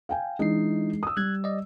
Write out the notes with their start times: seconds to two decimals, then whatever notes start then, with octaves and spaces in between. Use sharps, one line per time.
0.09 F5 G5 G#5
0.39 E3 G#3 D4 D#4 C7
1.03 D#6 E6
1.17 G3 F#6 G#6
1.44 D5 D#5